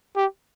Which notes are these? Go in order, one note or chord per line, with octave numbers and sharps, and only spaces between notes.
G4